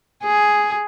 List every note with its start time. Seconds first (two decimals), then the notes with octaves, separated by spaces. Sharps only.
0.24 G#4